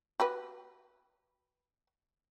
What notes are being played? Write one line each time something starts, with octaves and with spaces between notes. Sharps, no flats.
F#4 G4 B4